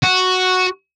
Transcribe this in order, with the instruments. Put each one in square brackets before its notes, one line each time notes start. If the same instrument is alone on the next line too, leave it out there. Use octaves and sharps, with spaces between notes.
[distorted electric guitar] F#4